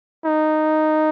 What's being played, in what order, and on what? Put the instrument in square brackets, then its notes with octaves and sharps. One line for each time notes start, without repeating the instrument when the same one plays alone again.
[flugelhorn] D#4